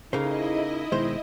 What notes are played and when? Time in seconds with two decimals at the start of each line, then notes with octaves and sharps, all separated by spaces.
0.13 C#3 A#3 D#4 E4 G#4 A4 C5 D#5
0.92 B2 D#3 G#3 C5